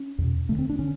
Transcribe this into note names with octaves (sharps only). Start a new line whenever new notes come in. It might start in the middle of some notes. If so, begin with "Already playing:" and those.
Already playing: C#4
E2 B2
D2 D3 A3
C4
D4
D3 C#4